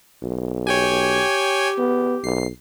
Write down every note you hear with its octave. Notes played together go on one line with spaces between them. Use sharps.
B1
G4 C#5 G5 G#5
B3
B1 C7